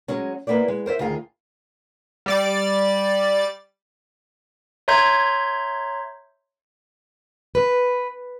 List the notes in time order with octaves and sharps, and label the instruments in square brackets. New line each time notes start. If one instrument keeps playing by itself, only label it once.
[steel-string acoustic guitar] F#3 G#3 C#4
A#3 B3 E4 C5 D5
G#3
A#4 C5 C#5 E5
D2 D#3 F4 G#4 F5
[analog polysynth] G3 D5 A6
[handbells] C#5 E5 A#5 C6 G6 G#6
[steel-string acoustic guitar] B4